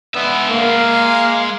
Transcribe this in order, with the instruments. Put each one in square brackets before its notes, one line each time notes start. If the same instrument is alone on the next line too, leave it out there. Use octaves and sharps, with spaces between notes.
[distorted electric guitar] G#3 E5 [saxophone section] B3 D4
[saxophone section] A#3 [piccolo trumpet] F5